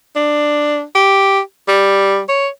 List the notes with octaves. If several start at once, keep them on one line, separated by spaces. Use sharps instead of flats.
D4
G4
G3
C#5